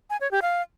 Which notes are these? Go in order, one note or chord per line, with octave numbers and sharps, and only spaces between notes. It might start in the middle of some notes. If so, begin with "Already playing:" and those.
G#5
C#5
G4
F5